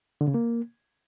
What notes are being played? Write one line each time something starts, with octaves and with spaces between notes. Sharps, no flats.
D3
C#3
A#3